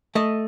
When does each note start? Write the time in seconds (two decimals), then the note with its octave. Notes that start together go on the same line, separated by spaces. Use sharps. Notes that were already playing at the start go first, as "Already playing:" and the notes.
0.15 A3 D#5